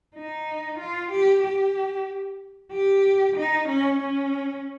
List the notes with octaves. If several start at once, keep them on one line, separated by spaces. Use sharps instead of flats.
D#4
F4
G4
G4
G4
D#4
C#4
C#4